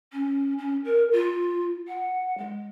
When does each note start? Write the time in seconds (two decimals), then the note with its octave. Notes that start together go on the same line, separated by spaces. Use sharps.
0.12 C#4
0.58 C#4
0.84 A#4
1.12 F4
1.87 F#5
2.38 G#3